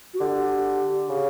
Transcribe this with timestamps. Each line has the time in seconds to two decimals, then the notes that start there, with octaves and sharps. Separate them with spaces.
0.14 F#4
0.19 D3 G4
1.09 C#3